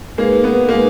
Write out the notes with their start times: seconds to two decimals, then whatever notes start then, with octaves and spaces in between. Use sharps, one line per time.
0.18 G#3 A#3 D#4 G#4 B4
0.44 B3
0.68 G#3 A#3 D#4 G#4 B4